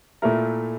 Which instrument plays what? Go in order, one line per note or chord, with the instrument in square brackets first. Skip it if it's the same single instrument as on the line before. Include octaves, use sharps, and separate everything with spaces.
[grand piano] A#2 A3 E4 A#4